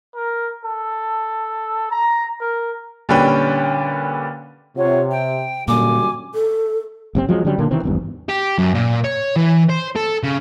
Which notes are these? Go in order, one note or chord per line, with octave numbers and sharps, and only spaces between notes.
A#4
A4
A#5
A#4
A#2 D3 G3 C#4 B4 G5
C3 F4 C#5 F#5
G5
F#2 A#2 D3 G3 G#5 D6
A4
F#1 C3 C4
F3 F#3 G#3
D3 F#3 G3 C#4
A#2 D3 D#3 A#3
C3 D#3 E3 C4
G#1 E2 G2
G4
F#2
A#2
C#5
E3
C5
A4
C#3